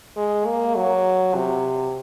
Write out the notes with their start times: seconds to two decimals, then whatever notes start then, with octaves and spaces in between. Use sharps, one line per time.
0.16 G#3
0.46 A#3
0.75 F#3
1.35 C3